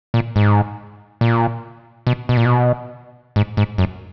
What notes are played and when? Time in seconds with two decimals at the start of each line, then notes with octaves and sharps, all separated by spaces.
0.14 A#2
0.36 G#2
1.21 A#2
2.07 B2
2.29 B2
2.37 A#2
2.45 B2
3.36 G#2
3.57 G#2
3.78 F#2